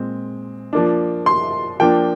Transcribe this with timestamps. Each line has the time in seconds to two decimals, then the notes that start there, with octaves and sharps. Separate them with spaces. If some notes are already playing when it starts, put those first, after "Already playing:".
Already playing: A#2 G#3 C4
0.73 F3 A#3 D4
1.26 C6
1.80 F3 A#3 D4 G5